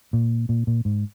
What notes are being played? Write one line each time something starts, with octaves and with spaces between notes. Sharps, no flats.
A#2
A#2
A#2
G#2